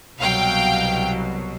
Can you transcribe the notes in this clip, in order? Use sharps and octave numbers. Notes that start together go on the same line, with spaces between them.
C2 B2 F#3 F5 G5